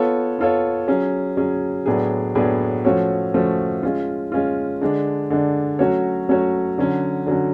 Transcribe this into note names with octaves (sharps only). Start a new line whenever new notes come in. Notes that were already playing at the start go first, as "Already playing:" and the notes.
Already playing: B3 F4 A4 C#5
B3 F4 A4 C#5
F#3 C#4 G#4
F#3 C#4 G#4
A2 F#3 B3 D4 G#4
A2 F#3 B3 D4 G#4
F3 A3 C#4 F#4 C#5
F3 A3 C#4 F#4 C#5
G#3 C#4 F4
G#3 C#4 F4
D3 G#3 D4
D3 G#3 D4
F#3 A3 C#4 F#4 C#5
F#3 A3 C#4 F#4 C#5
D3 F#3 C#4
D3 F#3 C#4